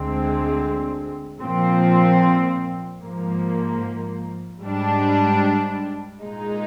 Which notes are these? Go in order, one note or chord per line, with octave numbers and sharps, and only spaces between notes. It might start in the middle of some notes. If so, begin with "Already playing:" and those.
Already playing: D2 D3 G#3 C4
A#2 F3 C4
G#2 F3 A#3
G#2 G3 D4
A#2 G#3 D#4